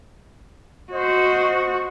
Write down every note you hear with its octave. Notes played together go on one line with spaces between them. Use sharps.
F#4 C5 D#5